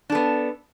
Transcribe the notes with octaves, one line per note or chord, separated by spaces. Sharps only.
B3 D4 A4